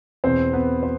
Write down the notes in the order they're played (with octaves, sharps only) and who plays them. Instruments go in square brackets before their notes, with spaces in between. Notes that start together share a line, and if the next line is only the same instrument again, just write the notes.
[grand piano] E2 B2 C4 C5
B3 B4
C5